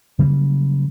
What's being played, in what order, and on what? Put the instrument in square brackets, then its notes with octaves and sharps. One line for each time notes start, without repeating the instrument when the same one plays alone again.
[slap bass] C#3 F#3 G3 A#3